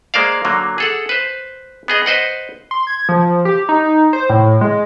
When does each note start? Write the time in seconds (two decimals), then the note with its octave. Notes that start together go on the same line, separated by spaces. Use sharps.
0.14 G#3 A#3 C5 D5 F5
0.45 D3 F#3 A#3
0.78 G#4 A4 F#5
1.09 B4 C5
1.88 B3 G#4 D#5
2.06 B4 C5 D#5 F#5
2.71 C6
2.87 G#6
3.09 F3
3.45 G4
3.69 D#4
4.13 C5
4.29 A2
4.61 G#3